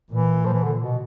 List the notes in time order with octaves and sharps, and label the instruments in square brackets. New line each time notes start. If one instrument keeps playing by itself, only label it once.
[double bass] A#2 [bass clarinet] E3
[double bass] A#2 [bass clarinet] F3
[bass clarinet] E3
D3
B2